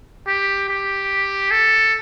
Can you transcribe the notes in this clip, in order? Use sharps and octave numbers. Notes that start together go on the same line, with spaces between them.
G4
G4
A4